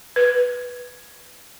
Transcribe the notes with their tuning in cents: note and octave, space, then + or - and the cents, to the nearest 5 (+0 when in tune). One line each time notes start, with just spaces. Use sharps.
B4 -5